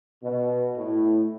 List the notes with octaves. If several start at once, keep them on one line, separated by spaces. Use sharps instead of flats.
B2
A2